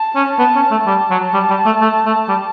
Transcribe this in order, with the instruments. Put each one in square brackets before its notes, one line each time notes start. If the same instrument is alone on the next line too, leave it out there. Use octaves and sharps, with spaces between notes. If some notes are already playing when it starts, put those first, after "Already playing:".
Already playing: [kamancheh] A5
[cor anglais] C#4
[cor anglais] B3 [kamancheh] A5
[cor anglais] C#4
A3
[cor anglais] G3 [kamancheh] A5
[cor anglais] F#3
G3
G3
A3
A3
A3
G3